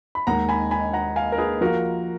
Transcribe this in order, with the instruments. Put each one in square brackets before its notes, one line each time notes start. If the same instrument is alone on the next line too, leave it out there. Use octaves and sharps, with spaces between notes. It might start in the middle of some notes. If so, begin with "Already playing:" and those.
[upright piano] B5
[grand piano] D#2 D#3 G#3 [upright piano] F#5 A#5
[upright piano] G#5 B5
G#5 B5
F#5 A#5
F5 G#5
A#4
G#4 B4
[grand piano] F3 A#3 F4 [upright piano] F#4 A#4